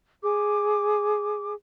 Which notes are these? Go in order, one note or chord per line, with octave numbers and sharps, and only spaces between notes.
G#4 D6